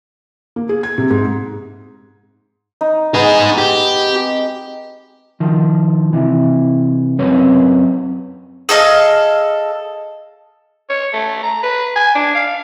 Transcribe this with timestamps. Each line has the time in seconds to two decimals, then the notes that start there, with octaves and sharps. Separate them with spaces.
0.56 A#3
0.69 G#4
0.83 G#6
0.98 C3
1.11 G#2
2.81 D#4
3.14 G#3 B3 D#4 G#4
3.58 G4
4.09 C4
5.40 D#3 F3
6.13 C3 E3
7.19 F#2 C4 B4 C#5
8.69 G#4 A4 D#5 F5
10.89 C#5
11.13 A3
11.43 A#5
11.63 B4
11.96 G#5
12.15 D4
12.35 F5